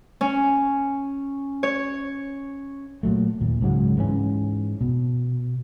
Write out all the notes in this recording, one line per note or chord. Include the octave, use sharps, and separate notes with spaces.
C#4
C#5
A#2 F#3 A3
D#2 A#2
C#2 G#2 F#3 G#3
G#2 E3 C#4
B2